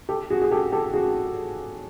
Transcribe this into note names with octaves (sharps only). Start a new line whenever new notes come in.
G4 A4
F#4 G#4
G#4
G4 A4
G4 A4
F#4 G#4